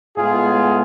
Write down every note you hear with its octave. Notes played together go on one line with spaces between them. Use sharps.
A2 G#3 B3 F4 G#4